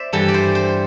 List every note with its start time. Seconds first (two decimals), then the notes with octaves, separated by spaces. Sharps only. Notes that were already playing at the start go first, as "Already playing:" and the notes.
Already playing: C5 D5 E5
0.13 G2 E3 G3 A4
0.28 D5
0.34 C5
0.55 C5